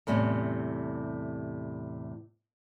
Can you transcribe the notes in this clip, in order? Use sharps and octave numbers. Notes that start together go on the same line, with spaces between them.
E2 A2 C3 G3 C#4